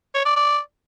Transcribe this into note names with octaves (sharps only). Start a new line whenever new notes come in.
C#5
D5
D5